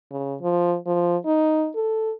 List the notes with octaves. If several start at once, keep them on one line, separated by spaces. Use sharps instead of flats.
C#3
F3
F3
D#4
A4